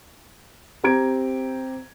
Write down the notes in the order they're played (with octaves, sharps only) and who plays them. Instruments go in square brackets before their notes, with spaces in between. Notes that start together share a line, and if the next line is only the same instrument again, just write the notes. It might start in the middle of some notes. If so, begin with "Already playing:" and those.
[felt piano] C4 G4 A#5 G#6 D7